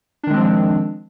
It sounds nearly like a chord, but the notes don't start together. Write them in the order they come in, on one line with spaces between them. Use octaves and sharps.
D4 D#3 G#3 C4 F3